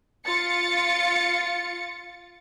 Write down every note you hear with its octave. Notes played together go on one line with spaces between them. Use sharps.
F4 A6 C#7